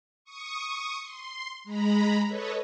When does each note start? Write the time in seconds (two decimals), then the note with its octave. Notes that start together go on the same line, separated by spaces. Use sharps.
0.25 C#6 D#6
1.03 C6
1.64 G#3 A#5 B5
2.27 A4 B4 C#5 D#5